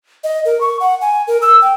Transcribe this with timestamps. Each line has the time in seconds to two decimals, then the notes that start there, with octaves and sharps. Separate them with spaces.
0.24 D#5
0.45 A#4
0.61 C#6
0.80 F#5
1.01 G#5
1.28 A#4
1.42 E6
1.62 G5